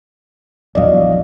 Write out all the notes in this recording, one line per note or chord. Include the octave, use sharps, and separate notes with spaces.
A#1 E2 F#3 D5 D#5 F5